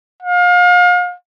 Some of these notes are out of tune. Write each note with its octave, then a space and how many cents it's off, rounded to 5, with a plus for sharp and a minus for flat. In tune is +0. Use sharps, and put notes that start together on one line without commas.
F5 +35